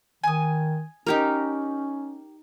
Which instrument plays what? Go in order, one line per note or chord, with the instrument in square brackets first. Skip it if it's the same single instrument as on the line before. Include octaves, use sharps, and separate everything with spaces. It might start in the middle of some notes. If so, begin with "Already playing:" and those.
[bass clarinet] D#3 [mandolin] G#5 D#6
[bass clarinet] C#4 [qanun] D#4 G4 A#4